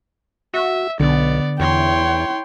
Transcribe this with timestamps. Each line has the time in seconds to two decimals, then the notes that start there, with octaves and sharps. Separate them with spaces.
0.54 F#4 E5
1.00 B1 D3 B3 D5
1.60 E2 E4 C#5 G5 C6